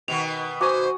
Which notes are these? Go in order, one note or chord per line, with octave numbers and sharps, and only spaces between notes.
B2 D#3 B3 F7
F#4 C5 G#5 D6 D#6